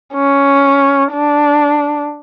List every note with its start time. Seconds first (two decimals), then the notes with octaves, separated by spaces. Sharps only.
0.14 C#4
1.13 D4